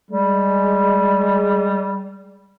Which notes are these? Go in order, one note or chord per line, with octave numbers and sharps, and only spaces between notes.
G3 G#3